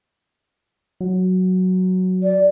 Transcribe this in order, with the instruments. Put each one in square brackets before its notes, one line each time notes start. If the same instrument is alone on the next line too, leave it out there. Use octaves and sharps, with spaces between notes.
[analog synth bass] F#3
[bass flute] D5